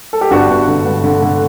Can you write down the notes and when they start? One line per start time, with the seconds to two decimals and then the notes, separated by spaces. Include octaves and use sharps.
0.13 A4
0.21 G4
0.31 G1 D4 F#4
0.50 G1
0.67 D3
0.86 G1
1.04 D3
1.22 D3